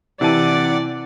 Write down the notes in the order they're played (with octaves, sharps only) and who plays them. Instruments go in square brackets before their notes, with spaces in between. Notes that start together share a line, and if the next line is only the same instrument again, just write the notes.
[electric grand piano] C3 E3 D#7 [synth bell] E4 A5 [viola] D5 [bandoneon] F#5 D6